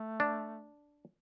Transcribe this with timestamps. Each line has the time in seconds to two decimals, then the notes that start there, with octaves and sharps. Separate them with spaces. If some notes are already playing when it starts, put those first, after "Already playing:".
Already playing: A3
0.20 D4